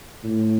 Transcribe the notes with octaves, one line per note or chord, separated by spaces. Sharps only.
A2